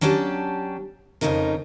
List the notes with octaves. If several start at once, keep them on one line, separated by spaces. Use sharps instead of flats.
F#3 C#4 D4 G4 A5
F2 A2 C#3 D#4 A#4